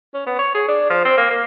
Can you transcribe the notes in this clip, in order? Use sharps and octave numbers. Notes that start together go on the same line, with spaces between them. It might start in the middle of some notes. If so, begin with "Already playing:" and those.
C#4
B3
C#5
G#4
D4
F3
C4
A#3
A#3